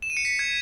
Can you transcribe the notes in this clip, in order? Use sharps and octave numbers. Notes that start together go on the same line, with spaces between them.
E7
D#7
C#7
B6
G#6